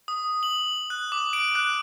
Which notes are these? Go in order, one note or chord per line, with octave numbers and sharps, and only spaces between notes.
D#6
F#7
F#6
D6
D7
F#6